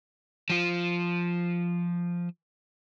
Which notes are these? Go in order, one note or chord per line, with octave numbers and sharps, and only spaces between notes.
F3 F4